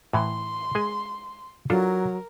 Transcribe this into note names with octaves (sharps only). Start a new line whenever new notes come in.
A2 E3 C6
G#3 G#4 G#5
F#3 D4 F4 A4 A#4